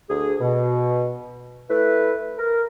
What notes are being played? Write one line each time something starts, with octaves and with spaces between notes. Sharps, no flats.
D2 G#4
B2
A3 E4 B4
A#4